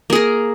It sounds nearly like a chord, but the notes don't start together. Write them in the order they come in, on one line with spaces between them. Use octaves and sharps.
A#3 G#4 A#4